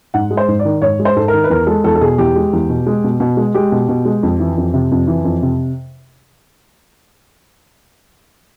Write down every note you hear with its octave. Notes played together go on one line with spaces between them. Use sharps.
G#2 F#5
G#3
C5
G#2
D5
D#3
G#2 C#5
G#3
C5
G#2 A4
A#4
D#3
B4
E2 A#4
G#3 A4
E2 A4
A4
B2 G#4
E2 G4
G#3
E2
B2
G#3
B2
B2
G#3
G#3 G4
B2
B2
G#3
F2
E3
F2
C3
F2
E3
F2
C3